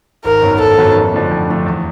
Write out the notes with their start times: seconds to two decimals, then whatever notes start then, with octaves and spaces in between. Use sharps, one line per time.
0.25 G#1 A#4
0.42 F#2 D#3 F#3 B3
0.60 G#1 A4
0.78 F#2 D#3 F#3 B3
0.96 F2
1.13 D3 F3 A3 D4
1.31 F2
1.48 D3 F3 A3 D4
1.66 E2